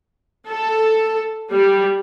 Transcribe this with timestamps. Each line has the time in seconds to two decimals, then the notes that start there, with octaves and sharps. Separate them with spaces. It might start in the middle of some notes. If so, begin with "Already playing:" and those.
0.49 A4
1.51 G3